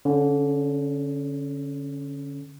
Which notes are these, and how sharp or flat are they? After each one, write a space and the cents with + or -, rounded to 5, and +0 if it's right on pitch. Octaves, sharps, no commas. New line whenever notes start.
D3 -25 C#4 +0